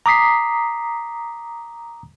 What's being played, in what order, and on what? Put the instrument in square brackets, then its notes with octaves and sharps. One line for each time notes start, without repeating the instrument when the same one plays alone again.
[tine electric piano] A#5 D6 D#6 B6 C7